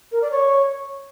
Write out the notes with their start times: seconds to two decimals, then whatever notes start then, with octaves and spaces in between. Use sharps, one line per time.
0.12 A#4
0.22 D5
0.31 C#5